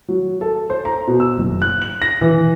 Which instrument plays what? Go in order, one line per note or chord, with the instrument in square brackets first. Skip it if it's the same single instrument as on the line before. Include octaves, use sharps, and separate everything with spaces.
[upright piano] F#3
A4
C5
A#5
B2
E6
F#1
F#6
F#7
A#6
E3